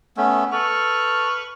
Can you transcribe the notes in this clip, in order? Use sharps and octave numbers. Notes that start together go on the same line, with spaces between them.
A3 B3 C#4
A4 B4 C#6 F6